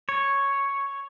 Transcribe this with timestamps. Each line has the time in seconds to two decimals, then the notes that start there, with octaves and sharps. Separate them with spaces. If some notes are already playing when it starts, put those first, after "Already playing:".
0.09 C#5